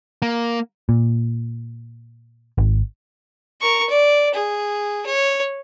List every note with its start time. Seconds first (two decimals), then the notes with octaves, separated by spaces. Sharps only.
0.22 A#3
0.89 A#2
2.58 G#1
3.61 A#4 C#6
3.90 D5
4.34 G#4
5.06 C#5